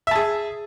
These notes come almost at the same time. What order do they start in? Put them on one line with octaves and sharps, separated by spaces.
E5 A5 G#4